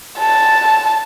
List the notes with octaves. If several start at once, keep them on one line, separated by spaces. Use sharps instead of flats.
A5